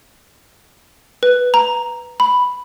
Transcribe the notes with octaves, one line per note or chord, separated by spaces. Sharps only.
B4
A#5
B5